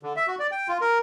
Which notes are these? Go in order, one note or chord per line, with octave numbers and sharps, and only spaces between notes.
D3
E5
F#4
D5
G5
F4
A#4